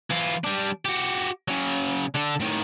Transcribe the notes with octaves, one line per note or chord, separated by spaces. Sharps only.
E3 F4
G3 D4
F#4 G4
C#3 F#3
D3 A4
A2 D#3